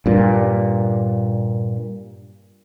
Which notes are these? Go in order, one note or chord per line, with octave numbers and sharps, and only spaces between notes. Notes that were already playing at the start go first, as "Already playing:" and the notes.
G2 A#2